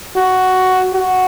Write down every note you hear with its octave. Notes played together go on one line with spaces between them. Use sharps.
F#4
F#4